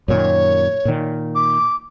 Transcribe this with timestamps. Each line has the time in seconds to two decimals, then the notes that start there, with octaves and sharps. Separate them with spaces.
0.08 F#2 A#2 D#3 C#5
0.85 A#2 D#3
1.35 D6